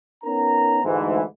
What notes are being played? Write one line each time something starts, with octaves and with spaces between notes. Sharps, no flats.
B3 C#4 D#4 A#4 A#5
D2 G#2 E3